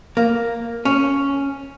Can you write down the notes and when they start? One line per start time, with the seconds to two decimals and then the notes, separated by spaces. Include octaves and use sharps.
0.17 A#3
0.85 C#4